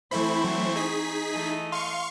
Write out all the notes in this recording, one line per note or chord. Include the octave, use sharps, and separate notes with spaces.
E3 A3 C4 E4 C5 B5 C#6
F#3
D#4 G#4 B6
E3 A3 D#5
F5 C6 C#6